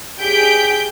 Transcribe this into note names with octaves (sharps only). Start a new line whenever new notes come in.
G4 G#4 G6 B6 D7